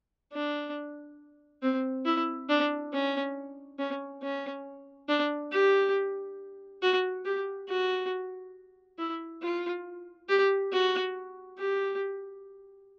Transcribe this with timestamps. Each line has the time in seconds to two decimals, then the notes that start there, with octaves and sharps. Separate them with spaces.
0.33 D4
1.62 C4
2.05 E4
2.49 D4
2.93 C#4
3.79 C#4
4.22 C#4
5.09 D4
5.52 G4
6.82 F#4
7.25 G4
7.69 F#4
8.98 E4
9.42 F4
10.29 G4
10.72 F#4
11.58 G4